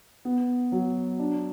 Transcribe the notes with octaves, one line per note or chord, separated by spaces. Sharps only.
B3
F#3
D4